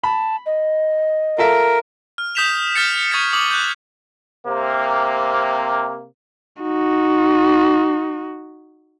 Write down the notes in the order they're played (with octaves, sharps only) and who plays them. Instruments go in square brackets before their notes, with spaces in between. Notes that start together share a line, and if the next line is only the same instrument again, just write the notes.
[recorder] A5 [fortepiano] B5
[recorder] D#5
[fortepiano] F4 A4 E5 [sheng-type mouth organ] A#4
[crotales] F6
D#6 G6 B6 E7 F7
F6 G6 A6 B6 C#7
C#6 D#6 G#6 A6 C#7
D6 D#6 F#7
F#6 G6
[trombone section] C3 A#3
[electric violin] D#4 F#4